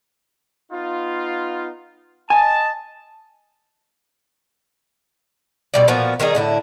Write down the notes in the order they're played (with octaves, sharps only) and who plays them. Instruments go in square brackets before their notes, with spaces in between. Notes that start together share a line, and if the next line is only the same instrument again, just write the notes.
[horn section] B3 D#4 F4
[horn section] D#5 A5 [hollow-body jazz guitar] G#5
[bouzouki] B2 G3 D5
A#2 F3 B3 F#4
D#3 G3 D#4 G#4
A2 D3 E4